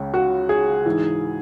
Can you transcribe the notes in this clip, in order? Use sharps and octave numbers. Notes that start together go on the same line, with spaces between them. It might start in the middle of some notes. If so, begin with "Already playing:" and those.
Already playing: C#2 C#3
F#4
G#4
G#2 E3